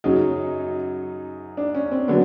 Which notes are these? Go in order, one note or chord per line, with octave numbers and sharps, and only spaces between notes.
F#2 C#3 F#3 D#4
D4
C#4
C4
D3 F#3 B3